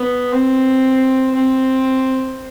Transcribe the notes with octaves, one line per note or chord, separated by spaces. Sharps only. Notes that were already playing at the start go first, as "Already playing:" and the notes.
Already playing: B3
C4
C4